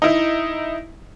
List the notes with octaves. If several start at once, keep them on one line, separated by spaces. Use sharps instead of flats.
D#4 E4